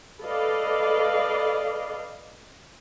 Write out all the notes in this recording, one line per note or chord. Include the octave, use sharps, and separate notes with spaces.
A4 B4 D5 D#5 F5